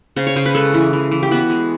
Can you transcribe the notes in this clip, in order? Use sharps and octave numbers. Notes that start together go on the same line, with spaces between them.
C#3 C5
C#5
C#3 C5
B4
G#3 A4
E3
E3
E3
G4
B3 F#4
G#3